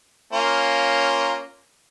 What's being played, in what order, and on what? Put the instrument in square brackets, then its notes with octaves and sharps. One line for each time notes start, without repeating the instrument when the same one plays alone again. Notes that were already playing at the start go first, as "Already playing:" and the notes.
[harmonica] A#3 C#4 F4